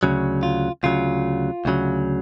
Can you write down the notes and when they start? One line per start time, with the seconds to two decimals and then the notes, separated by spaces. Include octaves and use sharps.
0.03 D2 C#3 F#3
0.43 F4
0.83 D2 C#3 F#3 F4
1.65 D2 C#3 F#3